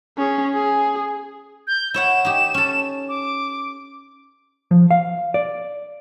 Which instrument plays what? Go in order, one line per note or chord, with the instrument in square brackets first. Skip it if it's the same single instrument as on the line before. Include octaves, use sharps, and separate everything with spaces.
[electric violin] C#4 G#4
G#4
[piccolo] G6
[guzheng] E4 C#5 F#5 [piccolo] E7
[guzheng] D#4 G4
C#4 A4
[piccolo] D6
[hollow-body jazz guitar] F3
F5
D5